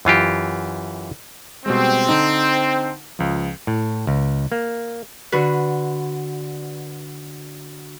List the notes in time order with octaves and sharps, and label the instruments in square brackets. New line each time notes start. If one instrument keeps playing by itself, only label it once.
[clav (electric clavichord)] F#2 E3 F4 G4
[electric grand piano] B2 G3 G#3 [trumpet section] C4
[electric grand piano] D3 D4 D#4
C#2 F3
[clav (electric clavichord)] A2
C#2
A#3
[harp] D3 F#4 B4